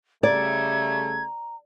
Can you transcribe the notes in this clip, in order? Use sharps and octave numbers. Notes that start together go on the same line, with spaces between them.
C#3 G3 A3 D5 A#5 G#6